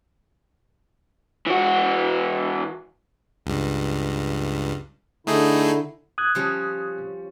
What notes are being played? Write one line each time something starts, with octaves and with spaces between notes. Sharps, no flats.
E3 F#4
C#2 G2
D3 A3 D#4 E4 G#4
D#6 F#6 G#6
F3 G3 C#4